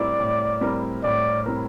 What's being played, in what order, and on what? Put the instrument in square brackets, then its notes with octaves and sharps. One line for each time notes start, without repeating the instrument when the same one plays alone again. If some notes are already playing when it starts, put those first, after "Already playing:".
Already playing: [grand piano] A2 G3 C4 E4 A#4 [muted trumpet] D5
[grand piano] A2
G3 C4 E4 A#4
[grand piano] A2 [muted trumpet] D5
[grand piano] G3 C4 E4 A#4